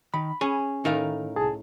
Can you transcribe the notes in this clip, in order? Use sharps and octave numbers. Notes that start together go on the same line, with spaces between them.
D#3 B5
C#4 G#4
A2 D#3 D#4 A#4 F5
C2 G#4 A5